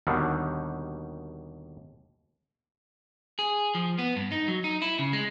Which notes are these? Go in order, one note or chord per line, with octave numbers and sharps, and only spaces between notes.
D#2 B2 D3 D#3 G3
G#4
F3
B3
G2
D#4
F#3
D#4
E4
C#3
G#3